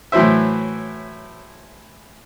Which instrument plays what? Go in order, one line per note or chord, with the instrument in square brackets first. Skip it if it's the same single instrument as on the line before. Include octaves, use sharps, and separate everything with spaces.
[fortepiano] A2 E3 F#3 E4 C5 E5